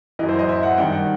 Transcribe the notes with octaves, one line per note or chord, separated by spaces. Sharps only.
F#2 E3 D#5
C5
D#5
E5
F#5
G2 D#3 G5
F#5